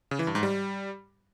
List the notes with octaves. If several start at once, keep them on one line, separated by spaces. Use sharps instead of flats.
C#3
E3
G2
G#2
G3